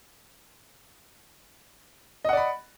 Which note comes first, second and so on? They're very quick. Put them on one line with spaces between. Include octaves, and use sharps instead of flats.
D#5 F#5 D5 B5